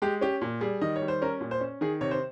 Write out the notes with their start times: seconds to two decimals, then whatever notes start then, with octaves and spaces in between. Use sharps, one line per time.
0.02 G#3 G4
0.21 C#4 G4
0.41 A#2
0.61 G3 G#4
0.81 D#3 D#5
0.96 C#5
1.02 G3
1.08 C5
1.22 C#4 A#4
1.41 A#2
1.51 C5
1.61 C#4
1.81 D#3 G#4
2.01 C3 C#5
2.11 C5